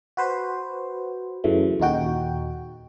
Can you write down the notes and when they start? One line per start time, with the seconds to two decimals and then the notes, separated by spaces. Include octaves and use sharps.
0.17 F#4 B4 C5
1.44 F#2 C#3 E3 A3
1.80 D#2 A#2 D#4 F#4 G5